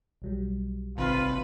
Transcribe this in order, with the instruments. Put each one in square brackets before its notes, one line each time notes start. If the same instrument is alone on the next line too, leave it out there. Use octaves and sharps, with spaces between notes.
[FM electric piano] B1 F#3 G3
[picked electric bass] G#1 C3 [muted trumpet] F4 [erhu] B4